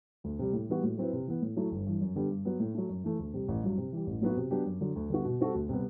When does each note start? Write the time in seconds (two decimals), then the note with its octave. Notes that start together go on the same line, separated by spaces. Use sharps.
0.24 D2
0.39 C3 G3
0.53 A2
0.69 E3 G3 B3 F#4
0.83 A2
0.98 F#3 C4 E4 B4
1.13 C3
1.27 E3 B3
1.42 A2
1.57 F#3 A3 E4
1.72 G1
1.86 G2 E3
2.01 F#2
2.16 D3 G3 B3 D4
2.31 G2
2.45 F#3 B3
2.60 A2
2.75 F#3 A3
2.89 F#2
3.04 E3 A3
3.19 D2
3.34 C3 G3
3.48 A1
3.63 G2 F#3
3.78 C3
3.93 E3 G3
4.07 A1
4.21 A2 F#3 B3 F#4
4.37 C3
4.51 F#3 B3 D4 G4
4.66 F#2
4.81 D3 F#3
4.96 D2
5.10 D3 G3 B3 F#4
5.25 B2
5.40 G3 C4 F#4 A4
5.55 D2
5.69 C3 G3 B3